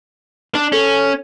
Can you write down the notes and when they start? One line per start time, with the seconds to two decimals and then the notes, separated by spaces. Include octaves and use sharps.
0.55 D4
0.72 C#4 A4